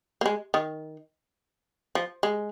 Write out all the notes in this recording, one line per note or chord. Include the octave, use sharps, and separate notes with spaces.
A#3
G#3
D#3
F3
G#3